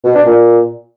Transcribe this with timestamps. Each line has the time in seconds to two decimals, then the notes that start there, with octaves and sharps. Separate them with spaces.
0.04 B2
0.15 D4
0.26 A#2